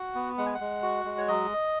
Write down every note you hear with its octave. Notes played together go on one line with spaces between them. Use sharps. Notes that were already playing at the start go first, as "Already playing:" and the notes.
Already playing: F#4 F#5
B3
G#3 F#5
G#5
F#5
G#3
F#4
G#3
C#5
F#3 D#5